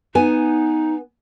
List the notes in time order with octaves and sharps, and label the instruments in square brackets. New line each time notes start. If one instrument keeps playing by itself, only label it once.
[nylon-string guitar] B3 G#5 [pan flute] D#4